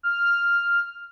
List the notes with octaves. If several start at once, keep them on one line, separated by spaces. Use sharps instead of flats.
F6